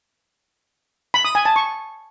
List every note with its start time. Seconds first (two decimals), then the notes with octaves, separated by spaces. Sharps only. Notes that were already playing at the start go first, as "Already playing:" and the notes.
1.14 B5
1.25 D#6
1.35 G#5
1.45 A5
1.56 C#6